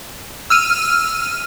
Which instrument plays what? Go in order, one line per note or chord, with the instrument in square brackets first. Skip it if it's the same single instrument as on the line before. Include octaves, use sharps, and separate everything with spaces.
[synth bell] E6 F6 D#7